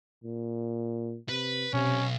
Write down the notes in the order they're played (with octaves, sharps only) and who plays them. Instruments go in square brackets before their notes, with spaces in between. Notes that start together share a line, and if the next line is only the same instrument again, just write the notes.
[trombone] A#2
[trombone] C3 [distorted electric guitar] B4
[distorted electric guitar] B1 [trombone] C3 [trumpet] C#4